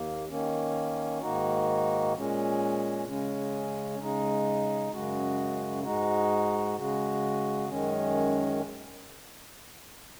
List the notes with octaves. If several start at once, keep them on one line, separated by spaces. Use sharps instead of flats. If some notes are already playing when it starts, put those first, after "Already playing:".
Already playing: D#2 A#3
D#3 A#3 C#4
G#2 D#3 A#3 D#4 F#4
A#2 G#3 C#4
C#3 G#3 C#4
C#3 G#3 D#4
F#2 C#3 G#3 F#4
G#2 G#3 D#4 F#4
C#3 G#3 F#4
F#2 D#3 G#3 C#4